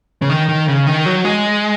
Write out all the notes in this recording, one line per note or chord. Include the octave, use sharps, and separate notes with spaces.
C#3
D#3
D#3
C#3
D#3
F#3
G#3